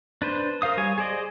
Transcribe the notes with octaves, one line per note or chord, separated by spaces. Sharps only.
D4 B4 C5
A#4 C5 F5 D#6
G3 C#5 G#5
G#4 C5 D5 D#5